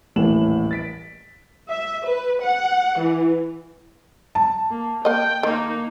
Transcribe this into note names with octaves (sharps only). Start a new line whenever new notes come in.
D#1 A1 A2 E3 E7 F#7
A6 B6 D7
E5
B4
F#5
E3
A5
A#3
A#3 D#5 G5
D#3 A#3 D#4